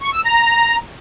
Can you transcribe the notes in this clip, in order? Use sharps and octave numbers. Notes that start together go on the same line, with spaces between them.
C#6
E6
A#5